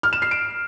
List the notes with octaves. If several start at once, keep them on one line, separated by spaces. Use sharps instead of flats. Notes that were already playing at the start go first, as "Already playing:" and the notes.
F6
E7
C7
D7